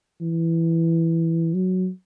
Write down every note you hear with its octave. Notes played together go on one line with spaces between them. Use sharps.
E3
F#3